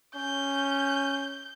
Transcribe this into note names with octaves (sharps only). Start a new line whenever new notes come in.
C#4 G6